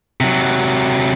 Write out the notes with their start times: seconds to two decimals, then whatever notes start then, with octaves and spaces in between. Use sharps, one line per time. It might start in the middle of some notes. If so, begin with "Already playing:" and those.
0.21 C3 F#3